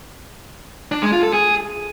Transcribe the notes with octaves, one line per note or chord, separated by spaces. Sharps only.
D4
G#3
F4
A4
G#4